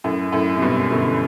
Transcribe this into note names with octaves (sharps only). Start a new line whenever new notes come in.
F#2 A2
F#2 A2
C3
G2 B2
B2 D3